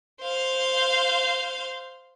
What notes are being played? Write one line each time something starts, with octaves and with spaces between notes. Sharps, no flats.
C5 F5